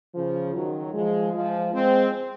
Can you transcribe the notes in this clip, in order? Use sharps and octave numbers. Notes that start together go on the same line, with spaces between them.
C#3 F3
D#3 F#3
F3 G#3
F3 G#3
G#3 C4